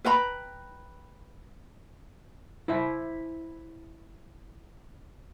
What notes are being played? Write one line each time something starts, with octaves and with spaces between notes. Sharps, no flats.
B4 G5 A#5 B5
E4 C5 E5